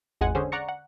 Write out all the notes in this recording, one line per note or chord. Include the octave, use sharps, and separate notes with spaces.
G#1 E2 G#3 F#5 G#5
D3 C#4 G#4 C5
D5 F#5 A#5 C#6 A#6 C#7
F#5